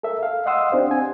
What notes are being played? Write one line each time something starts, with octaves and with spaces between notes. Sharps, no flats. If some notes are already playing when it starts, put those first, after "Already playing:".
A4 A#4 E5
F5
D#5 F5 F#5 C6 D#6 E6
C4 D4 G4 C5
G#5